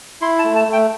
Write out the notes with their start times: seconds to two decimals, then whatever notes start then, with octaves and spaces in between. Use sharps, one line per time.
0.21 E4 C6
0.39 A5
0.44 A3
0.56 A5
0.68 A3 G5